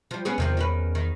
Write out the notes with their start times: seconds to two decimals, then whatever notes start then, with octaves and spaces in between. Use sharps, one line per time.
0.11 F3 G3
0.25 B3 C#4 G#4
0.38 E2 C3 D#3 F3
0.57 D#3 C#4 B4
0.95 D#3